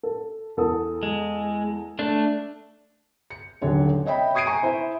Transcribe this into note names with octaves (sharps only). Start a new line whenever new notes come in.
A4
E2 A4 D#6
G#3
A3 D4
C#7
D#1 D3 F#3 C#5
C#5 D#5 E5 G5 B5
C#6 D#6 G#6 C7 D7 D#7
G#5 A#5 C#6 C#7
E4 C5 E5